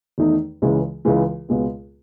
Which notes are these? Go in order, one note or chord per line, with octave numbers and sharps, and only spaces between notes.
E2 D#3 A3 D#4
C#2 C#3 E3 G#3
C#2 C#3 E3 G#3
C#2 B2 G#3 B3